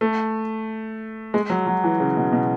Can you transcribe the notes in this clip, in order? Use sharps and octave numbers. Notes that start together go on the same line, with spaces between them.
A3
G#3
F#3
F#3
E3
C#3
B2
B2